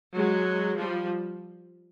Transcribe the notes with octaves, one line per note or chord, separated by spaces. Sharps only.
F#3 G#3
F3 G3